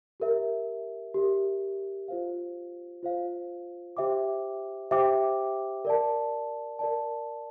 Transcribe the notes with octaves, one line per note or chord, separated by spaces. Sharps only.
G4 A#4 E5
G4 A#4 E5
F4 C5 F5
F4 C5 F5
G4 C5 E5 G5 D6
G4 C5 E5 G5 D6
A#4 D5 A5
A#4 D5 A5